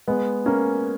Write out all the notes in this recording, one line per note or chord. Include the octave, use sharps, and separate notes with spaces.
G#3 B3
A#3 C#4